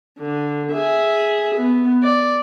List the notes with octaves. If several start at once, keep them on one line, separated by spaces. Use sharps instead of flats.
D3
G#4 E5
B3
D5